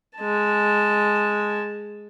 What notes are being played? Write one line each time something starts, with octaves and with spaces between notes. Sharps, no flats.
G#3 A5